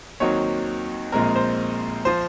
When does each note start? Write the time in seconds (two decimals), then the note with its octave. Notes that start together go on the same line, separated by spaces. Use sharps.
0.20 D#2 D#3 F#3 C4 C#5
1.12 A#1 A#2 G#3 C4 A#4
1.36 C5
2.05 F3 C5